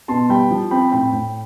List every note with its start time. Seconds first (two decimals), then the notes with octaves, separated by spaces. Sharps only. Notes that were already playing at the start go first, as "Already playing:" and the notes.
0.08 B2 A5 C6
0.29 G3 G5 B5
0.51 F3
0.71 C4 G5 B5
0.92 A2 G5 B5
1.12 A2